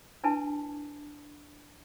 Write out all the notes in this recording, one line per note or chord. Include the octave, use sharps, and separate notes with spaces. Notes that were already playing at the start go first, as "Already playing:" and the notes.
D4 E4 B4 G#5 A5